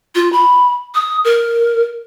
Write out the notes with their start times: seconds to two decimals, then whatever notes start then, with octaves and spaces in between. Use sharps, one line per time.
0.15 F4
0.33 B5
0.95 D#6
1.25 A#4